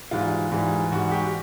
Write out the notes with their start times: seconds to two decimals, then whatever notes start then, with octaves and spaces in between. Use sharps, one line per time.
0.11 G#2 E3 G3 F4
0.51 G#2 E3 G3
0.91 G#2 E3 G3 F#4
1.11 G4